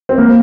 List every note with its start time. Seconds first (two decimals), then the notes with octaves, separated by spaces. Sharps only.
0.09 C4
0.18 A#3